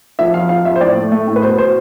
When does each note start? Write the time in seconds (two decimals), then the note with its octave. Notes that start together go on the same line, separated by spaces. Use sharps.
0.19 F3 E5
0.34 F2 F5
0.49 F3 F5
0.65 F2 E5
0.76 C5
0.81 A2 D5
0.97 A3
1.12 A3
1.27 A2
1.36 B4
1.42 B2 C5
1.58 B2 C5